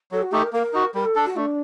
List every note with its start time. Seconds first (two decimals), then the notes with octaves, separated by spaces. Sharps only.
0.12 F#3 A4
0.22 F#4
0.32 A3 D#4 G4 A4
0.43 A#4
0.53 A#3 A#4
0.73 D#4 F#4
0.94 G3 A#4
1.04 A4
1.15 D4 A4
1.25 F#4
1.36 A3 D4